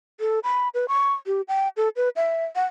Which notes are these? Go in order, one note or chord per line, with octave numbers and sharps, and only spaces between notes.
A4
B5
B4
C#6
G4
G5
A4
B4
E5
F#5